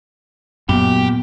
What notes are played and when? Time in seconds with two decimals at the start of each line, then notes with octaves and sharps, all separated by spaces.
0.69 F#2 A#2 B3 G4